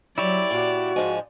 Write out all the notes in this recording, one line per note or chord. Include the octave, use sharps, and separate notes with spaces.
F#3 E4 G4 C#5 D5
A#2 F#4
G#2 F3 G#3